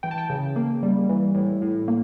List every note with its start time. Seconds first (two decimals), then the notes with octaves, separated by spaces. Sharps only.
0.03 E3 G5
0.11 A5
0.18 G5
0.30 C#3
0.56 A#3
0.83 G3
1.09 E3
1.35 A2
1.62 A2
1.88 A#3